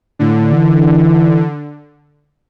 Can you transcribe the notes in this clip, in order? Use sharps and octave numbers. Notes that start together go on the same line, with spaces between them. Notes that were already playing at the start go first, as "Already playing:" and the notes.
A2 D3
E3